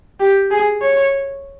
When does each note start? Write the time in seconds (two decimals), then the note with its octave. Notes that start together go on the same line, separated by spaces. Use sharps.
0.20 G4
0.51 G#4
0.82 C#5